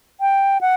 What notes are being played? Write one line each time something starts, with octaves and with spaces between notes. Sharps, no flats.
G5
F#5